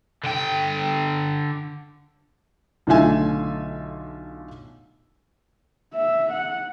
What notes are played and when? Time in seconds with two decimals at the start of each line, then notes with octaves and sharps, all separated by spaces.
0.24 D3 G5
2.87 B1 D3 A3 F4 E5 G#5
5.94 E5
6.32 F#5